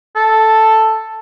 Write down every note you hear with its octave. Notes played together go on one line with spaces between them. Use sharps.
A4